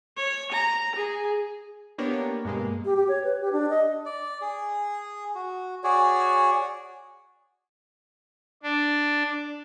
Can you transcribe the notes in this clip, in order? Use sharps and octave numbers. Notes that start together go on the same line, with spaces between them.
C#5
A#5
G#4
A#3 B3 D4 G4 A#4 C#5
G2 B2 G#3 A#3
G4
G4
C#5
B4
G4
D4
D#5
D5
G#4
F#4
F#4 G#4 C#5 D5
D4